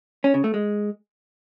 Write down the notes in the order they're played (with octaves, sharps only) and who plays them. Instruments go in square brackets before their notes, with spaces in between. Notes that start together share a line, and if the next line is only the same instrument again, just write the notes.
[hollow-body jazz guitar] C#4
C#3
A3
G#3